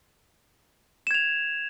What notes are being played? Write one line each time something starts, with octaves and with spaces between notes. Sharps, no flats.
G#6 E7 F7